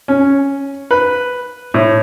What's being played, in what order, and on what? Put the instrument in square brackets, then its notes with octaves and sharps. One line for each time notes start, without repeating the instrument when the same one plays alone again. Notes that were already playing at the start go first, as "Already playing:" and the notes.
[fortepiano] C#4
B4
A2